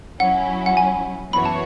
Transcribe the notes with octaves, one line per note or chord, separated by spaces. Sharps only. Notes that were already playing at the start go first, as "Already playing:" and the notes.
F#3 C#4 E4 F#5
F#5
G#5
F#2 E3 B3 F#4 C#5 B5
A5